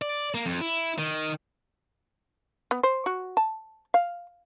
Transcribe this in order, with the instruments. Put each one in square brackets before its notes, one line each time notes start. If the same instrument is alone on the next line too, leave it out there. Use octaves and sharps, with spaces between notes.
[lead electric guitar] D5
A#3
F2
E4
D#3
[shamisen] B3
C5
F#4
A5
F5